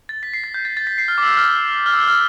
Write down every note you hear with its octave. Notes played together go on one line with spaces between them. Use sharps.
A6
B6
C7
A6
G6
A6
A6
B6
C7
F6
D6
E6
F6
F6
E6
F6